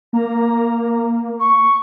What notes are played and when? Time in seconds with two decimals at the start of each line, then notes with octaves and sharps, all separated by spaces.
0.13 A#3 A#5
1.39 C#6